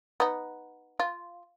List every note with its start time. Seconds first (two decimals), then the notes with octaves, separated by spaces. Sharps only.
0.20 B3 D#4
1.00 F4